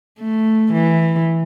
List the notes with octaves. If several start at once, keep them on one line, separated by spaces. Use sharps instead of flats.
A3
E3